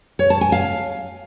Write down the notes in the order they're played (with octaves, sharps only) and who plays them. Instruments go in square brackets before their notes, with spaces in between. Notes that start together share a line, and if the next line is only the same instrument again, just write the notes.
[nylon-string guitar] C#5
A5
G#5
F5